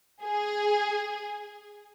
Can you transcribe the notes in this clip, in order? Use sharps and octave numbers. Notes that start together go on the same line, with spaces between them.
G#4